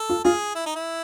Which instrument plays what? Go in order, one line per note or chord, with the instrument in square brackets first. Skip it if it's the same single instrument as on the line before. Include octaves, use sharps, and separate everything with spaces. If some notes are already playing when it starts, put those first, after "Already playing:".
Already playing: [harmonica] A4
[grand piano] F4
[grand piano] F4 [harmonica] G#4
[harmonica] E4
D#4
E4